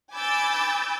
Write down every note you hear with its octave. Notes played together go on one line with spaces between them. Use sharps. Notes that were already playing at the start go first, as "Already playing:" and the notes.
G#5 B5 D6 E6 G6 A6